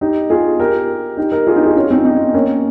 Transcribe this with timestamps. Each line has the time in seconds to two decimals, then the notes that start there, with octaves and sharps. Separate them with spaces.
0.01 D#4 G4
0.30 F4 G#4
0.59 G4 A#4
1.17 D#4 G4
1.32 G4 A#4
1.47 F4 G#4
1.56 D#4 G4
1.65 F4 G#4
1.76 C#4 F4
1.90 C4 D#4
2.05 C4 D#4
2.34 A#3 C#4